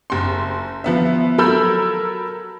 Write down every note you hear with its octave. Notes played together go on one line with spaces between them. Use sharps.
F#1 C6
F3 B3 E5
F#3 A4 A#4 B5 E6 G6